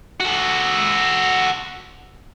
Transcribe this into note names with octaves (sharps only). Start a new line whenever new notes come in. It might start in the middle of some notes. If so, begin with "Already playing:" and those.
F#4 A4